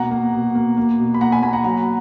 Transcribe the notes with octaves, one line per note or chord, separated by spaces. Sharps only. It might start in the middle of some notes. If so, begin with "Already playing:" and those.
Already playing: B2 A#3 F#5 A#5
A#3
B2
A#3
A#3
B2
B5
A#3 F#5 A#5
G#5 B5
A#3 G#5 B5
F#5 A#5
F#3 F#5 A#5